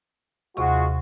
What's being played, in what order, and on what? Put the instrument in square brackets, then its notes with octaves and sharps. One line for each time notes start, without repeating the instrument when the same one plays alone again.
[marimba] D#2 C3 C#6 [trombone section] G#3 F4 F#4